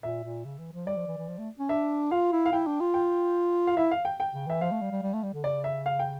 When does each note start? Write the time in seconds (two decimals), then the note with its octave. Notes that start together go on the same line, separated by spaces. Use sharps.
0.03 A#2 E5
0.24 A#2
0.45 C#3
0.59 E3
0.73 F3
0.86 G3 D5
0.97 F3
1.07 E3
1.17 E3
1.28 F3
1.38 A3
1.59 C#4
1.69 D4 E5
2.11 F4 F5
2.32 E4
2.46 F5
2.53 E4 G5
2.67 D4
2.80 F4
2.94 G5
3.67 F5
3.77 E4 E5
3.91 F5
4.05 G5
4.20 G5
4.33 C#3
4.47 E3 E5
4.61 F3 F5
4.71 A3
4.81 G3
4.92 G3
5.02 G3
5.13 A3
5.23 G3
5.34 D3
5.44 C#3 D5
5.64 E5
5.86 F5
5.99 G5